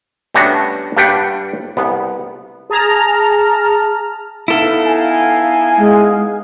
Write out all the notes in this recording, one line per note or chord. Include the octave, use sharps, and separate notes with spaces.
G3 A3 B3 C#4 D4 F#4
G2 G3 D4 B4 F#5 G5
C2 B3
G#4 A5 A#5 F6
B3 D#4 E4 A4 F5
G#5
G#3